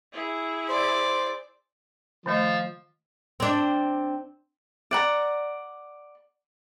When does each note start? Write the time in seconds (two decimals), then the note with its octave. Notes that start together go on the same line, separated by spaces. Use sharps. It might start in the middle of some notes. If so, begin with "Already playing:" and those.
0.13 E4 G#4
0.69 C5 D5
2.26 D#3 F3 A3 D#5
3.40 C4 D4
4.91 D5 F#5 A#5